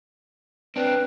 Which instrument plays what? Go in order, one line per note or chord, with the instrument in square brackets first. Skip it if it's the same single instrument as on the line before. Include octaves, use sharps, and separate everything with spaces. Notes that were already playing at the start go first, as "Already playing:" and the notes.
[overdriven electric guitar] C4 D4 [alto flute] B4